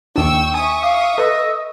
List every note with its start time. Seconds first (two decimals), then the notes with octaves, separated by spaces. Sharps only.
0.16 D#2 D4 G5 C#6 E6
0.54 E5 G#5 C#6 D#6
0.83 F5 D6
1.18 A4 B4 D#5 E6